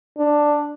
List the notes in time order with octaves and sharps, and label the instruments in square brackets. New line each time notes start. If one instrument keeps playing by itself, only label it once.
[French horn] D4